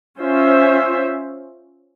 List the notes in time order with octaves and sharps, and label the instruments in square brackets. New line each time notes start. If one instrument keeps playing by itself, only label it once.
[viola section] C#4 F4 C5 E5